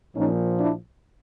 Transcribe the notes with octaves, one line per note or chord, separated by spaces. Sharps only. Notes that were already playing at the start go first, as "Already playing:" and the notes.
A#1 A#2 F3 C#4 D#4
D4 E4